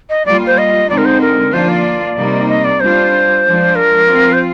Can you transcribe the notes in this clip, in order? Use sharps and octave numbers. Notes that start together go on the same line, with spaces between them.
D#5
G3 A#3 F4 D5
C5
D#5
D3 G#3 C4 D#4 D5
A#4
C5
A#4
F3 A#3 D4 F4 C5
D5
C3 G3 A#3 D#4
D#5
D5
G3 D4 F4 C5
F3 G#3 D4 F4
A#4
F3 C4 F4
C5